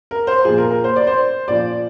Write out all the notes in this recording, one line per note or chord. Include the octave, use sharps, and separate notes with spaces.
A#4
C5
A#2 F3 G#4
A#4
A#4
C5
D5
C5
A#2 F3 D5